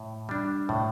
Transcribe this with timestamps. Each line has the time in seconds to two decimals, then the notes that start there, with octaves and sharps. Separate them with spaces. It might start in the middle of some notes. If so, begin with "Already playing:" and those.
Already playing: A2
0.29 G3 D4
0.69 A2